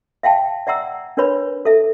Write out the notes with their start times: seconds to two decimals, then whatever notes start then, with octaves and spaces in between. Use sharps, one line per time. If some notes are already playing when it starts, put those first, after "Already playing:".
0.23 E5 F5 G5 A5
0.67 D5 E5 F#5 A#5 E6
1.17 D4 A#4 B4 C#5 B5
1.65 A4 E5